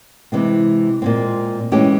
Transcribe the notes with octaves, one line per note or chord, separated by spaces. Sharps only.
C3 E3 G#3 C4
A#2 G#3 C4
E3 G#3 C#4 G4